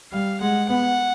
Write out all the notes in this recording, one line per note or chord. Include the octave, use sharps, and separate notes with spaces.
G3 F5
G#3 F#5
B3 F#5